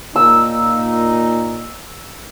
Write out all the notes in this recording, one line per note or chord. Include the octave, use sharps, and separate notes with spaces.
A#2 A#3 D#4 E6